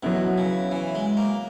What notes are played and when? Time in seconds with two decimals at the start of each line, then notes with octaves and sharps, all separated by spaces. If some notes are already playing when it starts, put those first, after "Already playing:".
0.03 B2 F#3 B3 E4
0.38 C#3
0.71 E3
0.95 G#3
1.17 A#3